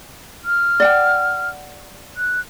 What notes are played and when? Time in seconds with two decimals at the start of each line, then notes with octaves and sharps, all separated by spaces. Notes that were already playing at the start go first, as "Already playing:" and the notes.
0.45 F6
0.80 D5 F#5 G5
2.17 F#6